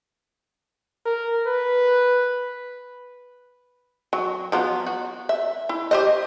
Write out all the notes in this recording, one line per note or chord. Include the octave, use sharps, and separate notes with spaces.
A#4
B4
F#3
F3 F#3 B3
F#4
E5
E4
G4 C5 D#5